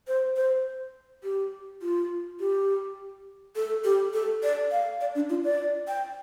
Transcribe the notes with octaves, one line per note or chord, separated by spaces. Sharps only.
C5
C5
G4
F4
G4
A4
G4
A4
D5
F5
D5
D4
F4
D5
G5